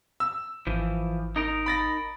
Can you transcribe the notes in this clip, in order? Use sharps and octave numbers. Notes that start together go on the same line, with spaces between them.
E6
G#1 E3 F3
D#4 A#4 A#5
B5 A6 A#6